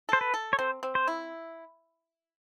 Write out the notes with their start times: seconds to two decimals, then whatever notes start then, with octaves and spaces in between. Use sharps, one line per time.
0.09 A4 C5
0.21 B4
0.34 A4
0.53 C#5
0.59 C4 C5
0.83 C4
0.95 C5
1.07 E4